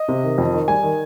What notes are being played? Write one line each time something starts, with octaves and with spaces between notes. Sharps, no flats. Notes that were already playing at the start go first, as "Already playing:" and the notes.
Already playing: D#5
C3
D#3
F2
D#3
G3 G#5
D#3